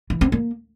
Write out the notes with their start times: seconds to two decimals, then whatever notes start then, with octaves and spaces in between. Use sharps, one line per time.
0.10 E3
0.21 C4
0.32 A#3